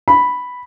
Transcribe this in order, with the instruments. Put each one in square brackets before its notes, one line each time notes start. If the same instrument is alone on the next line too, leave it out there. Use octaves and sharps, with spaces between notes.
[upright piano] B5